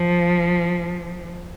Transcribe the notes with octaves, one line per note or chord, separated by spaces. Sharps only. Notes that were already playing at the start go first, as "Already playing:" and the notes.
Already playing: F3